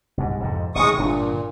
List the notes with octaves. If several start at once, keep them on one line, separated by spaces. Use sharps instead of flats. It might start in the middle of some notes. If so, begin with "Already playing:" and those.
C2 G#2
F2 G#2 C3
A1 C3 D#3 G#3 C#6 D#6
G1 A#2 D4